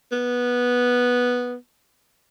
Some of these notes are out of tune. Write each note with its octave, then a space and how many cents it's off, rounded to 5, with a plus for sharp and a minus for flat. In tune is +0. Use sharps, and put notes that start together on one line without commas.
B3 -10